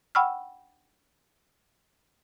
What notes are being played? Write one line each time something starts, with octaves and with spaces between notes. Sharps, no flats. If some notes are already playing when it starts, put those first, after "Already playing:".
F#5 G5 B5 C#6 E6 F6